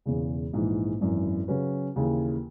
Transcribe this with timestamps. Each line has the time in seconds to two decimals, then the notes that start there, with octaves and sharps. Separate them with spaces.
0.06 E1 E2 C#3
0.53 A#1 G#2 E3
1.00 G#1 F#2 E3
1.48 C#3 F#3 C#4 F#4 B4
1.96 D#2 C#3 E3